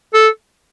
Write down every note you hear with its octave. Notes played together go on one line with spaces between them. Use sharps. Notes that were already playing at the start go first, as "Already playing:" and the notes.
A4